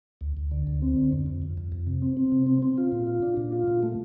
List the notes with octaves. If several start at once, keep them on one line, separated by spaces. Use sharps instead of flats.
D2
D2
D3
D2
C4
D3
F2
F2
F2
F2
F2
C3
C4
C4
C3
C4
C4
F4
A#2
F4
D4
A#2
F4
A#2
A3